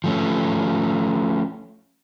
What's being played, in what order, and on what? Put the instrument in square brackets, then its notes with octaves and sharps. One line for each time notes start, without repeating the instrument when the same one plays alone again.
[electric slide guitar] F3 A3 C#4